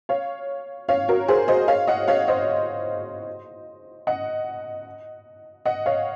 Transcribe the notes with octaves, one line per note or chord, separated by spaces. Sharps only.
C#5 F5
C#5 F5
F#4 A#4
G#4 C5
C5 D#5
C#5 F5
D#5 F#5
C#5 F5
C5 D#5
D#5 F#5
D#5 F#5
C#5 F5